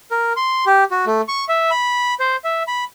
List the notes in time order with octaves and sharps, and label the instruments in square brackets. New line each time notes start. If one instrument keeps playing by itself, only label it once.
[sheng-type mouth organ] A#4
C6
G4
F#4
A3
C#6
E5
B5
C5
E5
B5